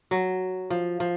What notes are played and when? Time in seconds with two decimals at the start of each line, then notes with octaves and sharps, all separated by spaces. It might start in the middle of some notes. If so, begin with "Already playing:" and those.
0.11 F#3
0.70 F3
1.00 F3